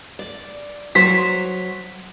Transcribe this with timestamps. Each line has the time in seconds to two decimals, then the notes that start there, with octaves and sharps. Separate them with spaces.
0.19 D5
0.95 F#3 C5 B6